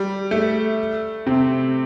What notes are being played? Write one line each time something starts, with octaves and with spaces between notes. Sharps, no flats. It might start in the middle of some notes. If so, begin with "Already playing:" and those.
Already playing: G3
A3
C3 C4